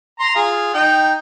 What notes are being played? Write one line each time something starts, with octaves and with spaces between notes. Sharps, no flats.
A#5 C6
F4 G#4
D#4 G5